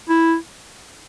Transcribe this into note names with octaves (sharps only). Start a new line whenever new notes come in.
E4